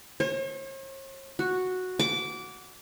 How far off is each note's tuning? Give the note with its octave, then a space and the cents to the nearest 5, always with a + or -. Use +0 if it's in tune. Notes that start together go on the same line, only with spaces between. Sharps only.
C#5 -45
F#4 -5
D6 -20